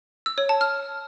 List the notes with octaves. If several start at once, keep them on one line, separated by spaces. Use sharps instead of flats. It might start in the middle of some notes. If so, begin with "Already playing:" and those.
E6
C#5
A5
F6